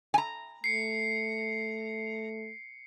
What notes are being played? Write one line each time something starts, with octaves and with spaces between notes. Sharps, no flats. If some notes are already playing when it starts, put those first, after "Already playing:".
G#5 A#5
A3 C7 C#7